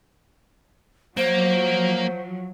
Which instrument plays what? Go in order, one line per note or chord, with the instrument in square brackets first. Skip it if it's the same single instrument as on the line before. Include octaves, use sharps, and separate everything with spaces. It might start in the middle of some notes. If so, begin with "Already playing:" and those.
[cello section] F3 F#3 [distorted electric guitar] A#3 [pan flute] C5